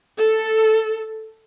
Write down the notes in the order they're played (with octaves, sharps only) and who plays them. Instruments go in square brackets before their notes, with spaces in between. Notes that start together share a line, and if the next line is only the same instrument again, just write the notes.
[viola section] A4